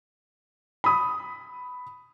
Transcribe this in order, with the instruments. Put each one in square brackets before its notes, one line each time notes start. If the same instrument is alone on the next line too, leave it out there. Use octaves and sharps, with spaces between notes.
[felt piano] B5 D#6